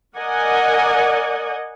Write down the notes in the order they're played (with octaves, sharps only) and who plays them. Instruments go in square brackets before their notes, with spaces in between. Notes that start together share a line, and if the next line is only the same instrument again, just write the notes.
[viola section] A#4 D5 D#5 F#5 G#5